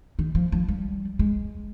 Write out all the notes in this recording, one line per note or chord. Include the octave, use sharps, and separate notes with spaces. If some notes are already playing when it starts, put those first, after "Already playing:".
D#3
F3
F3
G3
G#3